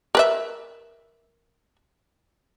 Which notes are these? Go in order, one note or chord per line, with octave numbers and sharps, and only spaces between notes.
A#4 B4 E5